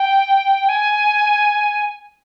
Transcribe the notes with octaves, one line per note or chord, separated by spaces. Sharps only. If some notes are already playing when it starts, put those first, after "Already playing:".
Already playing: G5
G#5